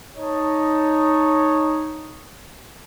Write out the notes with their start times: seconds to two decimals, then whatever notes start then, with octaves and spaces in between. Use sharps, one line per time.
0.17 D#4 C#5 D#5 A5 C#6